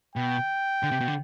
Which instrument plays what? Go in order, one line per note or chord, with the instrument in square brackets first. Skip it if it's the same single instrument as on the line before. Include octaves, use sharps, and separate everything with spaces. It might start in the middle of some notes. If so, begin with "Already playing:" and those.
[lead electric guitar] B2 [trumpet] G5
[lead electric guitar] D3
C3
B2
D3